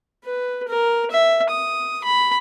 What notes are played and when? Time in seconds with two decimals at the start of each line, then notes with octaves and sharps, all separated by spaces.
0.24 B4
0.68 A#4
1.11 E5
1.50 D#6
2.04 B5